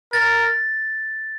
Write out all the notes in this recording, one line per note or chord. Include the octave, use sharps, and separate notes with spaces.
A#4 A6